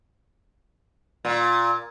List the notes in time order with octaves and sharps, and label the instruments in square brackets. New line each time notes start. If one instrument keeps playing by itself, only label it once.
[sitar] A#2